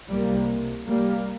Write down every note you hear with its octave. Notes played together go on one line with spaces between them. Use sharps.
C2 C3 G3 A#3
G3 A#3